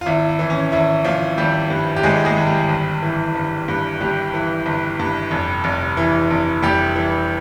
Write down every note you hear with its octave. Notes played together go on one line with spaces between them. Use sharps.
F4
G#1 E4
E4
E3
C#4
G#1 E4
G#1 F3 F4
G#1 G3 G4
G2
G4
G#1 G#3 G#4
G#3 G#4
G#1
G3 G4
G1
E3
G1
G2
G1 G3 G4
E3
G1
G2
F1
F1
E3
F1
F1 G3 G4
E3